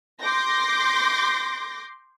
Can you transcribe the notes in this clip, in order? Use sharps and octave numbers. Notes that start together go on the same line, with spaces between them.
C6 D6 G6 A#6